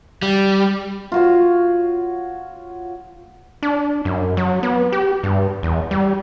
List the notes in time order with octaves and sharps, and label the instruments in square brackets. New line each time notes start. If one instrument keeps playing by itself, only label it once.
[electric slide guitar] G3
[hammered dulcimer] F4 F#4 C#5
[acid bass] D4
F#2
F#3
B3
G4
G2
E2
G3